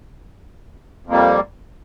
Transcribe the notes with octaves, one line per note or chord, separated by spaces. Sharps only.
F2 G3 A#3